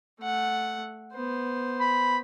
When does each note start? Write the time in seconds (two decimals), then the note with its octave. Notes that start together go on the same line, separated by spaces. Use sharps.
0.21 A3 F#5
1.13 B3 C5
1.80 B5